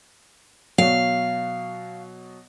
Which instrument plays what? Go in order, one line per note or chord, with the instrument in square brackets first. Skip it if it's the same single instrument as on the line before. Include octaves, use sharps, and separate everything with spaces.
[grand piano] B2 F#3 [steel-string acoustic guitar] F5